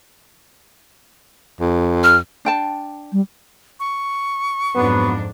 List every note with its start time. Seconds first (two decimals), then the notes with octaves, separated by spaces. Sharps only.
1.60 F2
2.04 F6
2.45 D4 G5 A5
3.12 G3
3.80 C#6
4.75 F2 G#2 F#3 B3 D4